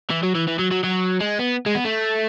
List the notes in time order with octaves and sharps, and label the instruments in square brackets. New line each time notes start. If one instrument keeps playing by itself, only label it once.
[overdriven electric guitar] E3
F#3
E3
E3
F#3
F#3
F#3
G#3
B3
G#3
B3
A3